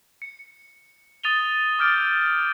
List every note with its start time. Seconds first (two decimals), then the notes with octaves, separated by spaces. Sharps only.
0.22 C#7
1.23 D#6 A6 D#7 F7 G7
1.79 D6 E6 F6 G6 A6 D7